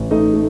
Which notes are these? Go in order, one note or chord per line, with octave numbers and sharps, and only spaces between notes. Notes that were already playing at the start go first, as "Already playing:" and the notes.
Already playing: A1
A3 D#4 D#5
A3